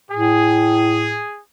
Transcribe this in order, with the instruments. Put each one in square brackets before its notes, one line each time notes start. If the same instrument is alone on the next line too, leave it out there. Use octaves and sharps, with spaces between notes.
[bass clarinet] A2 [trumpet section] G#4